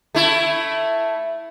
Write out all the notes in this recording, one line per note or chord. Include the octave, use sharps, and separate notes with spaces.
A3 E4